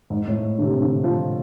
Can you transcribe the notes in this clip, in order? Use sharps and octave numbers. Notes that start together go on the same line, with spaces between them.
G#2
A2
D3
C3
D3
F3